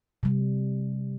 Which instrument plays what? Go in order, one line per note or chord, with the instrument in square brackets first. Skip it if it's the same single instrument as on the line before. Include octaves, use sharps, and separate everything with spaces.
[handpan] C3 G3